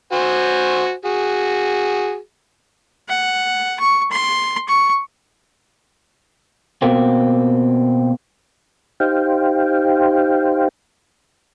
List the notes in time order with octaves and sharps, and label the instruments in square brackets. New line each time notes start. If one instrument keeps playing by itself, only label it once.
[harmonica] F#4 C5 G#5
F#4 G#4
[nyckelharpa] F#5
C#6
C6
C#6
[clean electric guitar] B2 A#3 C4
[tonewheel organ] D#4 G4 C5 F5 G5